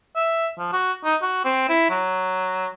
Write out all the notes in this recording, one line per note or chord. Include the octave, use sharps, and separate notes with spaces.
E5
F3
F#4
D#4
F#4
C4
E4
F#3